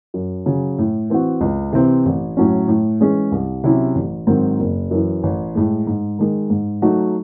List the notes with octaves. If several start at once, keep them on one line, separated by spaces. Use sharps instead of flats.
F#2
C#3 F#3
A2
E3 C4 F#4
C#2
C3 E3 C4
A1
A2 F#3 C#4
A2
E3 G#3 C#4 G#4
C2
C3 F#3 C#4 E4
A1
G#2 D#3 F#3 C4
F#1
F#2 E3
A1
A2 G#3
G#2
D#3 G#3
G#2
F#3 A3 D#4 F#4